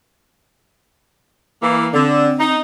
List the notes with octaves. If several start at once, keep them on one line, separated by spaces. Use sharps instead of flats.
E3 A#3
D3 C4
D#4